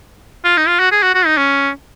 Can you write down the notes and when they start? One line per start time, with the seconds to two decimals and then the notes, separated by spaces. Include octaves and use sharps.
0.44 F4
0.57 D#4
0.68 F4
0.79 F#4
0.91 G#4
1.03 F#4
1.14 F#4
1.26 D#4
1.37 C#4